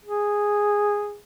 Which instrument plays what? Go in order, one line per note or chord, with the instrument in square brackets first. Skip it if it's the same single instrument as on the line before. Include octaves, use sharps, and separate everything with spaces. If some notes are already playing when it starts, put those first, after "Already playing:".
[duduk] G#4